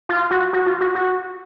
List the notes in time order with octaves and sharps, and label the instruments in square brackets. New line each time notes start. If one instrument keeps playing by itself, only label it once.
[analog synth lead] F4
F#4
F#4
F4
F#4
F#4